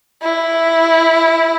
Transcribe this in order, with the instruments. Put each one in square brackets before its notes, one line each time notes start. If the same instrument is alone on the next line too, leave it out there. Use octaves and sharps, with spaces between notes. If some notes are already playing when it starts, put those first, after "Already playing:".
[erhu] E4